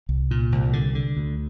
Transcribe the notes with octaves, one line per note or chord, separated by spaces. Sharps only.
C2
A#2
C2
D3
D3
D2